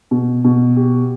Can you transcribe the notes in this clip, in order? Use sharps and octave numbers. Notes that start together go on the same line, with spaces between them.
B2
B2
G4